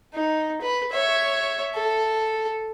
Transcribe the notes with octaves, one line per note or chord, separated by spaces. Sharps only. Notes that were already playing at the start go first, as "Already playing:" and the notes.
D#4
B4
C#5 E5
A4